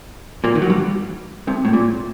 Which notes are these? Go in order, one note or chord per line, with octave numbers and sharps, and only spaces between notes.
A#2 A#3
D#3
F#3
G2 G3
C2 C3
A2
A#2